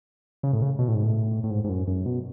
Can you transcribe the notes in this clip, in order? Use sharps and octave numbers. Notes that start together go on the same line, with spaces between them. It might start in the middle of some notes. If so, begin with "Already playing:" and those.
C#3
A2
C#3
B2
A2
G#2
A2
A2
G#2
G#2
F#2
F#2
B2